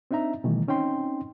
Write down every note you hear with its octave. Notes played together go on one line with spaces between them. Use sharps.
C4 D4 D#4 E5 A#5
B2 D#3 E3 G3 A3
C4 C#4 D#4 G5 C6